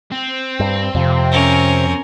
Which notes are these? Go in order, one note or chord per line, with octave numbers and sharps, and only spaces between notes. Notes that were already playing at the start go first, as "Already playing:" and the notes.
C4
G2
F2 C3
C#4 A#4